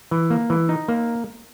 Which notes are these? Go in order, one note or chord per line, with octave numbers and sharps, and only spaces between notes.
E3
A#3
E3
D#4
A#3